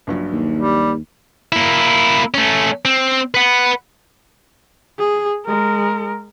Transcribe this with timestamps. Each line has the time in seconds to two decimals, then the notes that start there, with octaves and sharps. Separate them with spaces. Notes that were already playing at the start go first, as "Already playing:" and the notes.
0.07 A#1 G2 F#3
0.32 D#2
0.57 G3
1.52 A#3 E4
2.34 A3 C#4
2.85 C4
3.34 B4 F#5
4.99 G#4
5.46 G#3 A#4